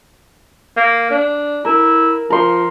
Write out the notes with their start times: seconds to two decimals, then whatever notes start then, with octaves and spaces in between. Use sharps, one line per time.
0.77 A#3
1.10 D4
1.65 E4 A#4
2.30 F3 A#4 C6